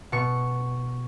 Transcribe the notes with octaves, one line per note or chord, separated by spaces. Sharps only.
B2 C#6